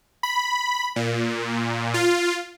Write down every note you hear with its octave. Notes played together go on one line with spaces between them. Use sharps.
B5
A#2
F4